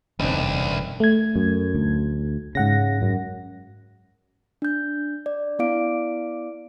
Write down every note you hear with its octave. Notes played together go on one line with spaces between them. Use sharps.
E1 C2 F#2 D3 C4 D4 D#4
A3 G#6
F#2
D2
G#2 C#3 F#5 A#6
F#2
D4 G6
D5
B3 E4 D5 F5 D6 D7